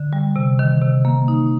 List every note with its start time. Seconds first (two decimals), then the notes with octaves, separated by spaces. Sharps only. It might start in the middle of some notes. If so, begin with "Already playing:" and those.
Already playing: D3
0.13 G3
0.36 C3
0.59 D#3
0.82 C3
1.05 A#3
1.28 D#4